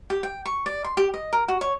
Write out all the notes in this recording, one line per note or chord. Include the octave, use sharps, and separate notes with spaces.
G4
G5
C#6
D5
C6
G4
D#5
A#4
F#4
C#5